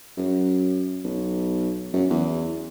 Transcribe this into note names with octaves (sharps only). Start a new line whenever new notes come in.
F#2
B1
F#2
E2